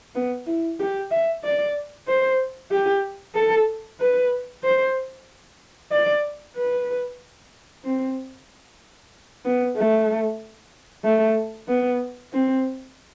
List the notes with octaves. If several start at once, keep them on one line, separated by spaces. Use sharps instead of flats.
B3
E4
G4
E5
D5
C5
G4
A4
B4
C5
D5
B4
C4
B3
A3
A3
B3
C4